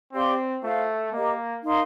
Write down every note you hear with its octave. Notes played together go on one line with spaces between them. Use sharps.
C4 G4 D5 F5 C6
A3 F4 C5 F5
A#3 G4 A#4 D#5
D#4 A#4 F5 C6